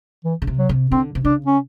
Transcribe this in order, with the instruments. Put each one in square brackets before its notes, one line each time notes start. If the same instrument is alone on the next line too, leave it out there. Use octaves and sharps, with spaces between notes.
[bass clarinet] E3
[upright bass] C#3
C3
[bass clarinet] F#3
[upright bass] C3
[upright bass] D3 [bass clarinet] C4
[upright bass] C3
[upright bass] C#3 [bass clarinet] D4
[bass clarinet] C#4